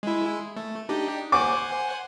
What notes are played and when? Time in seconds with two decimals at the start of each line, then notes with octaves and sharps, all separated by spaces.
0.03 G#3 E4
0.56 A3
0.89 D4 D#4 G4
1.32 C5 F#5 G#5 D6